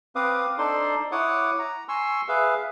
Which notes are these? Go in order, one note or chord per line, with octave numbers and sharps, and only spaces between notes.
C4 B4 F5 D6 D#6
D4 D#4 A4 C5 D5 C6
E4 C#5 F#5 D6 D#6
A#5
G#5 C6 C#6 E6
G#4 B4 E5 F5